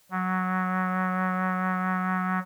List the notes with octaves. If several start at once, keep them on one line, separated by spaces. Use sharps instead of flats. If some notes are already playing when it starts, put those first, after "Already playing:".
F#3